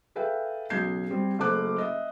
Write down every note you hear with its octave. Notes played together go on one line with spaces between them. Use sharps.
G#4 A4 B4 E5 F5 G5
B1 C#3 G6 G#6 C7
G3 C4
F#1 A3 C5 D6 F#6
D#5 E5